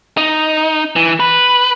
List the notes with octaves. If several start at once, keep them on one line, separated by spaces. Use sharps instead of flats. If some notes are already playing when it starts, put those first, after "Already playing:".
D#4
E3
B4